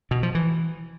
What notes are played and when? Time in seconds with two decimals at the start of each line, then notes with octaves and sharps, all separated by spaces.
0.11 B2
0.23 F3
0.35 E3